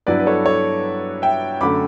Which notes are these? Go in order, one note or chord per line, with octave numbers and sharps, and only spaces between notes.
G2 F#3 B3 E4 B4 D5
B4
A4 C#5
A4 C#5
E5 G5
F#2 D3 A3 B5 D6